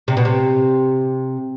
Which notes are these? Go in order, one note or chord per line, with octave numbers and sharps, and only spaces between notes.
C3
B2
C3